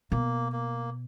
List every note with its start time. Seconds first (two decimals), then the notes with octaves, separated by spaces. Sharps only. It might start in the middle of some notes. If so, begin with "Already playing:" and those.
0.12 B2 A#3
0.52 A#3